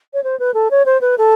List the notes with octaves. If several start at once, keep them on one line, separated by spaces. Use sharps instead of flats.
C#5
C5
B4
A4
C#5
C5
B4
A4